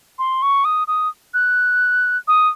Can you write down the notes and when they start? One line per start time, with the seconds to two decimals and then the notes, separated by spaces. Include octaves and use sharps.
0.19 C6
0.42 C#6
0.65 D#6
0.88 D#6
1.34 F#6
2.28 D#6